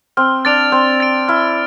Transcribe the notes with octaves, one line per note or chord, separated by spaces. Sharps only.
C4 F6
D4 A6 D7 F7
C4 F6
A6 D7 F7
E4 F6